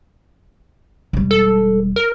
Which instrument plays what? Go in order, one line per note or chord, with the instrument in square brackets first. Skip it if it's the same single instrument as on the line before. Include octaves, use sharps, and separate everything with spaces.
[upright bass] E1 G3
[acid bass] A4
A#4